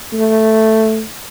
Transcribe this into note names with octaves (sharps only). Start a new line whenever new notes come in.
A3